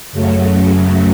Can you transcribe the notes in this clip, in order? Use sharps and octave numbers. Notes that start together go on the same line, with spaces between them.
F#2 C#3 F#3 A3